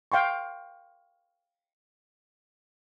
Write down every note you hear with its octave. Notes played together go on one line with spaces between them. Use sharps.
F5 G5 C6 C#6